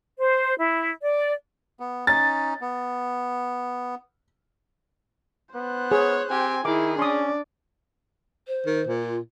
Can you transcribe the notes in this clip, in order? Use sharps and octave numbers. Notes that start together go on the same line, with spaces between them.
C5
E4
D5
B3
C#4 D#4 A6
B3
B3 C5 F#6
G#4 C#5
C4 G4 G#5
D#3 E4 G#4 D6
C#4 D4 D5 C6 D#6
C5
D#3
A#2
F4